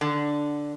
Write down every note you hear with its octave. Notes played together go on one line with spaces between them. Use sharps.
D3